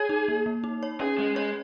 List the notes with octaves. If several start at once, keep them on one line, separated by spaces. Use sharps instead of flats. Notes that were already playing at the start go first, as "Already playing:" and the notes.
Already playing: G#4 C#5
D#4
A#3
A#3
D#4
C#5
C#4 G#4
G#3 C#4
G#3 C#5